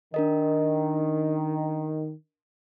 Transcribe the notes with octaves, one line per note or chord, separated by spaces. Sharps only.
D#3 D4 A#4 D#5